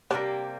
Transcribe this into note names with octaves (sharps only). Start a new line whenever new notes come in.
C3 E3 G3 A#3 D4